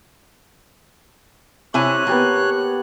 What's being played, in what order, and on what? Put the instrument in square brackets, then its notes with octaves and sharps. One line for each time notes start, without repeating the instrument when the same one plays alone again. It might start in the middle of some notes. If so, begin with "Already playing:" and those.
[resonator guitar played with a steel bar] C3 E4 G#5 [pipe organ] C#5 F#6
[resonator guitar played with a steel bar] A#3 [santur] B3 G4 A5